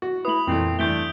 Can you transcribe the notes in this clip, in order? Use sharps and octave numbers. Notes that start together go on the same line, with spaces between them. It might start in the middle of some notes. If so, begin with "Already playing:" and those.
F#4
A3 E4 B4 D#6 F#7
F2 A#2 E3 A3 C4
G2 E3 A3 G6 D7 G7